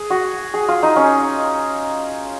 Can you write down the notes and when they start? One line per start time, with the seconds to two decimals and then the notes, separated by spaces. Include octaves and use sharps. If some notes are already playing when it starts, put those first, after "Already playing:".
Already playing: G#4
0.10 F#4
0.54 G#4
0.68 F4
0.83 D#4
0.96 C#4